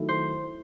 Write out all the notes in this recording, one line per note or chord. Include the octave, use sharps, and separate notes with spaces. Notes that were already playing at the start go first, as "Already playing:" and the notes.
Already playing: D#3 F#3 A3 E4
C5